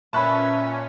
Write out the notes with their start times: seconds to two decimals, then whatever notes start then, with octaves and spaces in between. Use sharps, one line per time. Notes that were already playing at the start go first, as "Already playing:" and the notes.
0.13 A#2 C#4 B4 E5 A5 B5 C#6 F#6